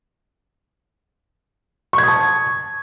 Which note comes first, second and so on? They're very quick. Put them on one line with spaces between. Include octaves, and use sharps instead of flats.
C#6 G#6 D#6 A5